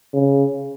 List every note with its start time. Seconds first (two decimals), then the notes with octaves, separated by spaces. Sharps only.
0.14 C#3